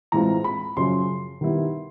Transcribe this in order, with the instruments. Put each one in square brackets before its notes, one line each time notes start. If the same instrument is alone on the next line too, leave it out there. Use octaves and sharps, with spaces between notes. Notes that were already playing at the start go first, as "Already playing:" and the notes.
[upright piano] A2 E3 G#3 C4 F4 A#5
B5
F#2 C#3 F3 C6
D#3 G3 B3 E4